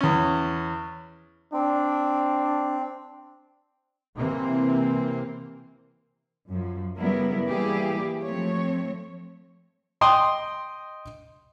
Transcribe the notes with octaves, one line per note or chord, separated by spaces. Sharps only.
E2 C#4
C4 D4
C3 E3 A#3 C4
F#2 F3
C#3 F#3 G3 B3 E4 A#4
E3 G3 A#3 E4 G4 G#4
F3 A3 C4 C#5
D#5 G5 C6 D#6